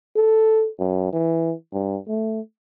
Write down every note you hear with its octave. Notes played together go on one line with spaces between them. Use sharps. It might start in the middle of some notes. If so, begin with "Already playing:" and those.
A4
F#2
E3
G2
A3